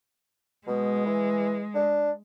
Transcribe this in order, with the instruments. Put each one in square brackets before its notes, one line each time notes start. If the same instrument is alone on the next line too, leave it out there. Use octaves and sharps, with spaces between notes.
[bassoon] B2 [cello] G#3
[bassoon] E3
D4